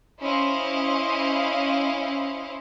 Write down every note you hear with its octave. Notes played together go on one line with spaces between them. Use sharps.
C#4 E4 C5 D#5 F5